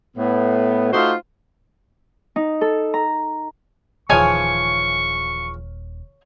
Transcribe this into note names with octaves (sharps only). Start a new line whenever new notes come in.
A2 B3
A3 D#4 F4 F#4 C5
D#4
A4
A#5
D#1 C#3 E3 F3 C#5 G#5 C#6 D#6